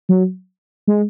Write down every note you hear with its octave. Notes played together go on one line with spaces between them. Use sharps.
F#3
G#3